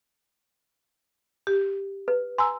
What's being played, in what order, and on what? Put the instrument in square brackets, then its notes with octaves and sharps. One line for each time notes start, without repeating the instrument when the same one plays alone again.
[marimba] G4
[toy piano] B4
[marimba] G#5 A#5 E6 [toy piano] C6